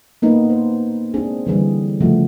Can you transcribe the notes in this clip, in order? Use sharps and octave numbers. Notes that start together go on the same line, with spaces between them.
A#3 B3 D#4 B4
C5
G#3 C4 D4 G#4
D3 E3 G3 G#4
C#3 F3 A3 F#4